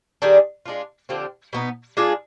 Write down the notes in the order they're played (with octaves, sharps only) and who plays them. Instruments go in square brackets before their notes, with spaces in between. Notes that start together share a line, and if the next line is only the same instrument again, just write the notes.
[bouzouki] D#3 G3 D4 G#4
G#3 D4 F4
D3 F3 C4 G4
B2 B3 D#4
G#3 D4 F4 G#4